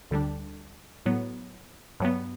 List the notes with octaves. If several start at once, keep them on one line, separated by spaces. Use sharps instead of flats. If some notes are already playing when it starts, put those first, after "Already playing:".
D2 D3 G3 D4
A2 F#3 B3
G2 F#3 B3